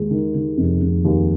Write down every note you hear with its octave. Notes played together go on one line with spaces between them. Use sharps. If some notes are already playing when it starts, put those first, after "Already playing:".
Already playing: D#2 G#3
D#3
D#3
F1
F1
D#2